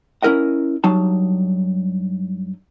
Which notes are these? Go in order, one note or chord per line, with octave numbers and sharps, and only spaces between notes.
C#4 E4 A#4 D#5 F#5
G2 F#3 D#4 A5